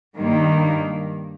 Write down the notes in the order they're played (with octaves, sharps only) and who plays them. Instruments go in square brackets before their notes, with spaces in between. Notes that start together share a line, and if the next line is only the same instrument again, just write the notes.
[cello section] G2 D#3 G3 A#3